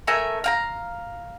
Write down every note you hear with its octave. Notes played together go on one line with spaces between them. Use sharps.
A3 A#4 E5 G#5
F5 G5 A#5